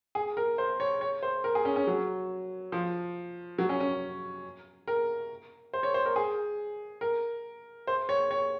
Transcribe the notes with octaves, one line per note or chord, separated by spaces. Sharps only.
G#4
A#4
C5
C#5
C#5
C5
A#4
G#4
C#4
C#4
F#3
F3
F#3
C#4
C#4
A#4
C5
C#5
C5
A#4
G#4
A#4
C5
C#5
C#5